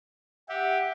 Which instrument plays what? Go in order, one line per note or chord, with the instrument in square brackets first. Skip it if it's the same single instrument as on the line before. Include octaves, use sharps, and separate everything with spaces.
[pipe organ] G4 [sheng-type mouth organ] E5 F#5